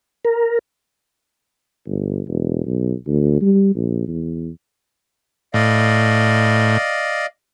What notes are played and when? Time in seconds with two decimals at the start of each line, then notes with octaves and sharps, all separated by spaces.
0.25 A#4
1.86 G1
2.27 E1
2.65 B1
3.07 D2
3.41 G3
3.75 A#1
4.08 E2
5.54 A2 D5 D#5 F5